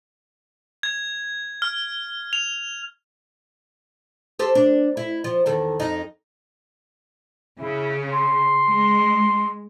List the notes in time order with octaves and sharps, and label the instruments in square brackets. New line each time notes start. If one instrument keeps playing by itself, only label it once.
[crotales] G#6
F6
F7
[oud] G4 A4 C5
D4
E4
F3
E2 D#3 A4
F2 D#4
[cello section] C#3 [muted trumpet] E4
[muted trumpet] C6
[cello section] G#3